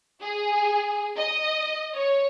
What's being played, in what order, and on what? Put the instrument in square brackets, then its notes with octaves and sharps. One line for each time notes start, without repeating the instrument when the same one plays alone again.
[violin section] G#4
D#5
C#5